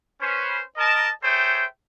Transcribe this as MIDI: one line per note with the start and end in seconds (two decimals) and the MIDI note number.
0.22 0.62 61
0.22 0.62 71
0.22 0.62 72
0.77 1.09 70
0.77 1.09 75
0.77 1.09 81
1.24 1.66 68
1.24 1.66 69
1.24 1.66 72
1.24 1.66 73
1.24 1.66 76
1.24 1.66 79